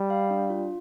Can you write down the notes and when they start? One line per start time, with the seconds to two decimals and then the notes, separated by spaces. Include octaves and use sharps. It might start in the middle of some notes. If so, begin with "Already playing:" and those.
Already playing: G3
0.10 F5
0.31 D4
0.50 F4